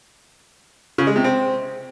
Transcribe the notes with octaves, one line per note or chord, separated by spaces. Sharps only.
C#3
G#3
C3
C4